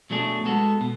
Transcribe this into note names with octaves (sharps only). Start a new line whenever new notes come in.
B2 F#3 A3 D4 G#4
G#3 B3 F#4 A4
B2